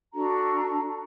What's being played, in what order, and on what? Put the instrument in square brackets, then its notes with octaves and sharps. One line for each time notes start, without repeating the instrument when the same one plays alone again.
[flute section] D4 F#4 A4 A#5